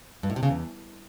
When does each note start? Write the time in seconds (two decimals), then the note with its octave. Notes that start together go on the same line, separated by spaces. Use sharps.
0.23 G2
0.30 A2
0.36 C3
0.43 C#3
0.49 E2